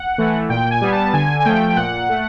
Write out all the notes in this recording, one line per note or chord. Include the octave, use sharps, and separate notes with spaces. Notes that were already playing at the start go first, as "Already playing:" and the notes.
Already playing: F#5
E3 A3
A#2 G5
G#5
G3 B3
A5
D3 G#5
G#5
F3 A3 G5
G5
A#2 F#5
A3